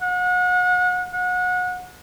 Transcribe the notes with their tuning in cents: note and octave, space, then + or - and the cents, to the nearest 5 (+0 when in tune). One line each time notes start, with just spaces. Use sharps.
F#5 -35
F#5 -30